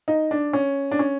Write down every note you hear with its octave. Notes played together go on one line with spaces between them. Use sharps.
D#4
D4
C#4
D4
C#4